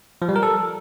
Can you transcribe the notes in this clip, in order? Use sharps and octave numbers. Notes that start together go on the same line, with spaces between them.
F3
G3
A#4
A4